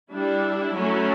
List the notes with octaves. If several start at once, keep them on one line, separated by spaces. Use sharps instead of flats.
G3 D4 E4
F#3 A3 C#4